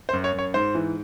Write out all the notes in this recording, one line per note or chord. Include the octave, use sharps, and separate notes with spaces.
C5
F#2
C#5
F#2
C#5
G#2 C5
E3